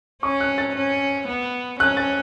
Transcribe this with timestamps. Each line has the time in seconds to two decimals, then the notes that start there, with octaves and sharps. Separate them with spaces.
0.23 C#4 C#6
0.40 F#6
0.58 A6
0.75 C#4
1.28 B3
1.80 C#4 F#6
1.97 A6